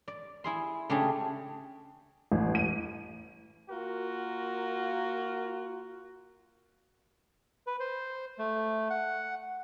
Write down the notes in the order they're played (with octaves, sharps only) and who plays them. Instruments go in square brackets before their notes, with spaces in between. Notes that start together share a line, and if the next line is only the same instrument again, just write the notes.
[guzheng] D5
E4 G#4 C6
C#3 A3 D4 G4 G#4
[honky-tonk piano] A1
D#7
[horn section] A#3 F4 F#4 A#4
[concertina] B4
C5
A3
F#5